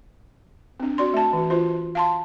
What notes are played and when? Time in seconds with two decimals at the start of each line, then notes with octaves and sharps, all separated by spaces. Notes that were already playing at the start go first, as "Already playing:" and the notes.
0.80 C4 D4
0.98 F#4 D5 C6
1.14 A3 A5
1.33 E3 F#4
1.50 F4 C5
1.95 F5 A5 C6